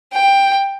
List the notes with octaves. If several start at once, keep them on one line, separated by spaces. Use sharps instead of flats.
G5